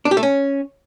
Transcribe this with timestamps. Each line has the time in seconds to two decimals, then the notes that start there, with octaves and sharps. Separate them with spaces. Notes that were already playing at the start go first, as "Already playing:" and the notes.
0.05 D4
0.11 G4
0.17 A3
0.23 C#4